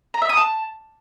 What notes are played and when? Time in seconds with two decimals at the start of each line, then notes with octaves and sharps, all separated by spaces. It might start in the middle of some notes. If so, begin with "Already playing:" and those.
0.14 A#5
0.22 E5
0.29 D#6
0.37 A5